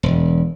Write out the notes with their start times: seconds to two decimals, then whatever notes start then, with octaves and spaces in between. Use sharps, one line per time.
0.03 E1